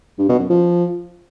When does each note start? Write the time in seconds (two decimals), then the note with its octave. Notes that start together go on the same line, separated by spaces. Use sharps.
0.19 G2
0.29 B2
0.39 F#2
0.50 F3